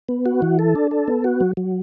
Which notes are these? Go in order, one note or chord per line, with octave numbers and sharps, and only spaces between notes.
B3
F#4
E3
A4
D4
A4
B3
F#4
F#3
F#3